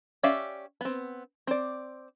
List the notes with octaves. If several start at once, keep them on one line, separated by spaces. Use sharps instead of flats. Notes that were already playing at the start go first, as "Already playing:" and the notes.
C#4 G4 D5 E5 F5
B3 C4
C4 D5